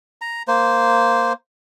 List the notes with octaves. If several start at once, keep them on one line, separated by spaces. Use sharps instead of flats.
A#5
A#3 C5